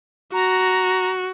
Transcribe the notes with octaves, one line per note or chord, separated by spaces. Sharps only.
F#4 A#5